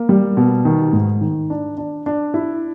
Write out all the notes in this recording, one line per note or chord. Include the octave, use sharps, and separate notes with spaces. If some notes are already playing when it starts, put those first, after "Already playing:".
Already playing: A#3
G3
B2
D#3
G#2
D#3
D4
D4
D4
E4